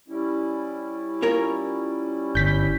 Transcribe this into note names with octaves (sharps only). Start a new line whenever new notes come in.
G3 C#4 E4
F4 A#4 C#5
G1 G6 B6